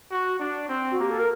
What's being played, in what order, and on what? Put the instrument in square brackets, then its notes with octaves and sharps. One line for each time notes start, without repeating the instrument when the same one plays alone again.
[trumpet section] F#4
D4
C4
[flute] F#4
[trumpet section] A#3 [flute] G4
[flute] A4
A#4